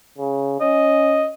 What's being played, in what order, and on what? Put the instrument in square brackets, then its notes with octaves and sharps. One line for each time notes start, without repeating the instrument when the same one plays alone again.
[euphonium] C#3
[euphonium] C#4 [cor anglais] D#5